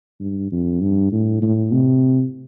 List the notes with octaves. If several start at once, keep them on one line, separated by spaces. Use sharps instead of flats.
G2
F2
G2
A2
A2
C3